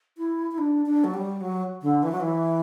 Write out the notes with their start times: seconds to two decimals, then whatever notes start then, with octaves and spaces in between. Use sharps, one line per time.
0.17 E4
0.51 E4
0.58 D4
0.86 D4
1.04 F#3
1.14 G3
1.41 F#3
1.82 D3
2.03 E3
2.12 F#3
2.20 E3